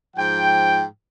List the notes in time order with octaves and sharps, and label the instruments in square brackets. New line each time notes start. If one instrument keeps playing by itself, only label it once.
[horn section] G#2 F3 G5